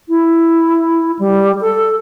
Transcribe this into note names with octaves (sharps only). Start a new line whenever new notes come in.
E4
G3
A4